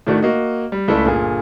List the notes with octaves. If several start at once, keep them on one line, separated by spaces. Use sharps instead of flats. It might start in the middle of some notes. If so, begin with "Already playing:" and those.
A2 D#3 A3 D4 F#4
A#3 F#4 D#5
G3
C#2 A3 E4 A4 D5
G1 A#2 G#4